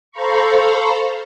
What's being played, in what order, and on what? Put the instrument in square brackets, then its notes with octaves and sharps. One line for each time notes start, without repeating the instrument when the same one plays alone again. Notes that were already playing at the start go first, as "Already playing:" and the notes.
[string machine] A4 C5 F5 A#5 B5 C#6